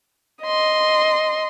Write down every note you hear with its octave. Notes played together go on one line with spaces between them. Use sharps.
D#5 C6